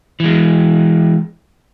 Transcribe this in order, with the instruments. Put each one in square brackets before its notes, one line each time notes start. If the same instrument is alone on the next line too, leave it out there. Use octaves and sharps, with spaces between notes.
[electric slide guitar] E3 G#3